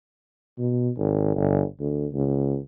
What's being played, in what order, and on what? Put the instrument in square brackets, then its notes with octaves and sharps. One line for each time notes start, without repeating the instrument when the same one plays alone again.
[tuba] B2
G#1
G1
D2
C#2